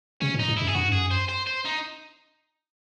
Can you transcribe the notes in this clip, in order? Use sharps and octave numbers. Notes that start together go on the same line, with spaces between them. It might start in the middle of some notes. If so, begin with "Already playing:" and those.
C3 C#4
A2
D#4
G#2
F#2 E4
G#4
F#2 F#4
G#2
F#2 G#4
C5
C5
C5
D#4